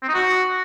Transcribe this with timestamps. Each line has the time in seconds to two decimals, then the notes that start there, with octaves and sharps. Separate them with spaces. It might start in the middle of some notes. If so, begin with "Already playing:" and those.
0.02 C4
0.08 D#4
0.14 F#4